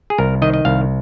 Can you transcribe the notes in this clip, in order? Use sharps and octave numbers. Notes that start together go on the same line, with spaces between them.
G#4
C2 A#4
D#3 D#5
D#5
C2 F5